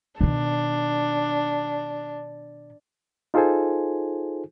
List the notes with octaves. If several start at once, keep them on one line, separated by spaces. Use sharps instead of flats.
B2 D#3 D4
D#4 F4 G#4 A4 C5 G#5